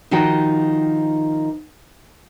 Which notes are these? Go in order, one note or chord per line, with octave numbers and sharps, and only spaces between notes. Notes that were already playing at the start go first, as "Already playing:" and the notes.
D#3 F3 D#4 F#4 G5